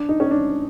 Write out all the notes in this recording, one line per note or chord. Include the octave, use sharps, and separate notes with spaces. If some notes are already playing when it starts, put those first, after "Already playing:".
Already playing: D4
D#4
C#4
D4